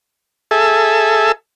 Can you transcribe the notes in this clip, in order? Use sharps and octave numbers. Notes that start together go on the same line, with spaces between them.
G#4 A4 E5